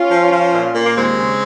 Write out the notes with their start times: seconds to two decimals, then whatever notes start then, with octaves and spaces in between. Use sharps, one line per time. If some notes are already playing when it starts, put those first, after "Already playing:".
Already playing: C#4 F4
0.10 F3
0.31 F3
0.53 A#2
0.74 A#2
0.84 A#3
0.95 D#2 G#3 C4
1.18 C#3